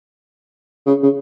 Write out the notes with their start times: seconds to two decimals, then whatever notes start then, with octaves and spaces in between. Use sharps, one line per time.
0.86 C#3
1.03 C#3